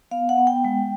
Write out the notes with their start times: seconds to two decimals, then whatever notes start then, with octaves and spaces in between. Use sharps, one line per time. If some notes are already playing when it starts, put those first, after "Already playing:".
0.11 B3 F5
0.29 F#5
0.38 B3
0.47 G5
0.65 G#3